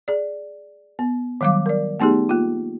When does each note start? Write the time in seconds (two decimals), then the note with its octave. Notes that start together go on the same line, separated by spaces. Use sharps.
0.08 G#4 D5
0.99 B3
1.41 D#3 F#3 G3 F5 D6
1.66 A#4 D5
2.00 A3 B3 D#4 G4 G#4
2.29 A#3 F4